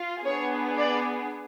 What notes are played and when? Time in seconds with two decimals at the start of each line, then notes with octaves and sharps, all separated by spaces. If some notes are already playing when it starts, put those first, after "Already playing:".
Already playing: F4
0.25 B3 D4 G#4 C#5
0.78 D5